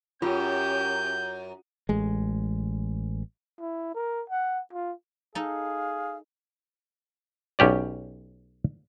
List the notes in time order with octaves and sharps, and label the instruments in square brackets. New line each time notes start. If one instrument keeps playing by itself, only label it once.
[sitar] F#2 [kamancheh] C#4 G4 [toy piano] F4 [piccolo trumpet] G6
[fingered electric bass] A1 G#3
[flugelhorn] E4
A#4
F#5
F4
[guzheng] D#4 A4 [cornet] G#4 [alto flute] F5
[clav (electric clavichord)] B1 C#4 G4 D5